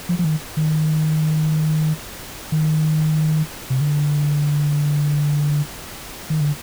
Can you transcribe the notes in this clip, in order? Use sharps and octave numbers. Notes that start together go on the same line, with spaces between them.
F3
F3
D#3
D#3
D#3
C3
D3
D#3
D3